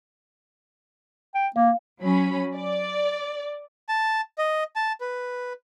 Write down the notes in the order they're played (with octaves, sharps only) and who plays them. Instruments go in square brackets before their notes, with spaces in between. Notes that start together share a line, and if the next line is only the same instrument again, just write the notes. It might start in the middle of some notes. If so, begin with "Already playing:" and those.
[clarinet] G5
[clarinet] A#3 [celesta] F5
[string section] F#3 C#4 B5
D5
[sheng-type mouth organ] A5
D#5
A5
B4